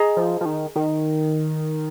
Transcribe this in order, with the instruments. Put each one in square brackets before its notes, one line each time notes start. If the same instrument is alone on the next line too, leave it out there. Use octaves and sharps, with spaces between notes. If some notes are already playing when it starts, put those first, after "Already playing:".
Already playing: [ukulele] G#4 D#5 A#5
[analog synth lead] F3
F3
D#3
D#3